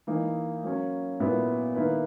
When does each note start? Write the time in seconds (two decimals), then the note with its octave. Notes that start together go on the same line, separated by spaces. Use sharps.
0.07 E3 A#3 D#4
0.63 F#3 A#3 C#4
1.20 A#2 F#3 B3 E4
1.75 D#3 A#3 E4 B4